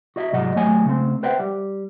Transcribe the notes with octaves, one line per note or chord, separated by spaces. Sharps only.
F#4 D#5 E5
C2 G#2 F#3 F#4 D#5 F#5
D#2 F#3 A3 C#5 G#5
C#3 A3 C4
B4 C5 E5 F#5 G5
G3